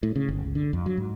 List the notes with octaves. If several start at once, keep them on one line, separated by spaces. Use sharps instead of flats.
A2
C#3
G1
C#2
D3
F2
F#3
G#2